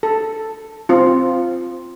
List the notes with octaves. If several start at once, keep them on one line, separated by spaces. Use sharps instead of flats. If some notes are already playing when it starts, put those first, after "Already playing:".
A4
C4 F4